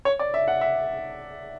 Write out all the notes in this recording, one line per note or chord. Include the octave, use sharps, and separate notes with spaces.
C#5
D5
E5
F#5
E5